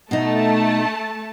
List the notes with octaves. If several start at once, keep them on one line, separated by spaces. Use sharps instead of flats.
B2 A3 D#4 A5